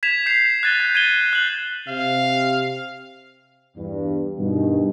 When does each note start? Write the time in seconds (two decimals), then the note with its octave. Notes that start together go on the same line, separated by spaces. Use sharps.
0.03 G#6 B6 E7 F7
0.26 G6 B6 C7 F7
0.63 F#6 G#6 A6 D#7 G7
0.80 G6
0.95 G#6 D#7 E7 G7
1.33 F#6 F#7
1.88 C3 F5
3.77 E2 G2
4.38 G2 B2 D#3